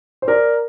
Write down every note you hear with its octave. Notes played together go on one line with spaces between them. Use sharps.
C5
A#4 D5